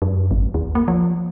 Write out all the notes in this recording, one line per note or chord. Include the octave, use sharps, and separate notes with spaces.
F#2
G#1
D#2
A#3
F3